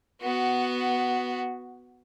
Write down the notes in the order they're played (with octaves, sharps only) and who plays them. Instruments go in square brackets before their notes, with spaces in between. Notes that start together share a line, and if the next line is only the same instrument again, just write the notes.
[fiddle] B3 F#4